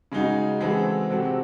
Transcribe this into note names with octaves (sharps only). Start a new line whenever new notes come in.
C#3 G#3 D#4 F#4
E3 G#3 C4 F#4 A4
C3 F#3 C4 F#4 A4